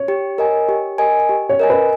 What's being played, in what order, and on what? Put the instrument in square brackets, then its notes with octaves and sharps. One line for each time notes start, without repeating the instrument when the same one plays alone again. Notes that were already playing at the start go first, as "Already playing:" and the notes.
Already playing: [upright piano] C#5
[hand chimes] G4
A#4 D#5 G#5
G4
A#4 D#5 G#5
G4
[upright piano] C#5
[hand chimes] A#4 D#5 G#5
[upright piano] B4